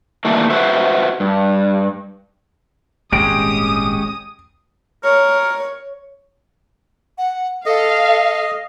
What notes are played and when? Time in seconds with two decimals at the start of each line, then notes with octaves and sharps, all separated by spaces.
0.25 D#3 E3 G3 A3 A#3
0.50 F#4 B4 C5 E5
1.20 G2
3.13 D#1 G#1 C3 G#3 C#4 G4 D#6 D7
5.04 A#4 C#5
7.18 F#5
7.66 A4 D#5 F5